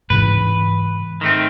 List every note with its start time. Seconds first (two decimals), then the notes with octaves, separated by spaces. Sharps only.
0.10 G#2 C#3 E3 B4
1.21 D#3 A3 C4